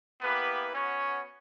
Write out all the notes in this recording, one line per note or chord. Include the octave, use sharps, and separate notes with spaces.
A#3 B3 E4 G4 B4
B3 C#4 F#4 C#5